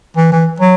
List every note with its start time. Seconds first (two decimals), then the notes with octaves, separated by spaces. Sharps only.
0.17 E3
0.32 E3
0.60 F#3